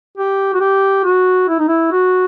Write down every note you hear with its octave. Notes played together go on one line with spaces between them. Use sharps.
G4
F#4
G4
F#4
E4
D#4
E4
F#4